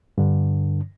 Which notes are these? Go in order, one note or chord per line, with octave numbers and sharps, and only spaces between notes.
G2 D3